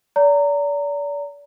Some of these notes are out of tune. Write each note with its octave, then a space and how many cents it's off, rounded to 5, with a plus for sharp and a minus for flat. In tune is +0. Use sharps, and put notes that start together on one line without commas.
D5 -35 A#5 -20